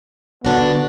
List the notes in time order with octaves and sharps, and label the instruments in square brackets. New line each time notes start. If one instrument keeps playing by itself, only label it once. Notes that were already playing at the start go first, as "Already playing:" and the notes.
[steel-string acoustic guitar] D3 D4 F#4 [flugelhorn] B3